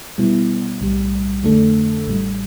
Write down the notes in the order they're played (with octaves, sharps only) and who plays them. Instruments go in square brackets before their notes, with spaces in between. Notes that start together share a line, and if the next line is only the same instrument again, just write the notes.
[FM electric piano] B2 G3 B3 E4
B1 A2 G3
F2 D3 A3 D4 A4
A1 A2 G3